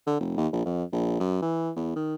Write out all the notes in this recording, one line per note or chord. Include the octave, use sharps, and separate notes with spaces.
D3
F1
D#2
A#1
F2
A#1
F#2
E3
E2
D#3